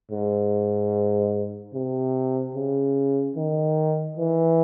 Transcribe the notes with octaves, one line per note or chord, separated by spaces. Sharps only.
G#2
C3
C#3
D#3
E3